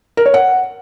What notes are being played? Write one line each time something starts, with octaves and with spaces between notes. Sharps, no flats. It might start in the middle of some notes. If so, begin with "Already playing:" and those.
A#4
C#5
F#5